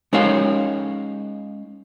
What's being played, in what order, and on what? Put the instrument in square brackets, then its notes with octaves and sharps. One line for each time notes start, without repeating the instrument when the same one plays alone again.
[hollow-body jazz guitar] G#3 C#4 D#4 A#4 C#5 F5